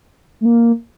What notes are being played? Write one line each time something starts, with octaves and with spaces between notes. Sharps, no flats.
A3
A#3